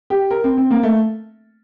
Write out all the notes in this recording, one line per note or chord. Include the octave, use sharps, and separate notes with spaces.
G4
A#4
C4
C4
A#3
A3